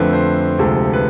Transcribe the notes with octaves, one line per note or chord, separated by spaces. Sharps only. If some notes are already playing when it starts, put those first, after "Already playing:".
Already playing: F2 D3 F3 A3 B4
C5
D2 C3 F3 G#3 A4
B4